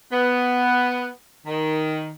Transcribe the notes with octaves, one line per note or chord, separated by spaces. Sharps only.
B3
D#3